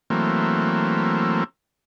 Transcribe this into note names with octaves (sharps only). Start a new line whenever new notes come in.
E3 F#3 A3 A#3 C4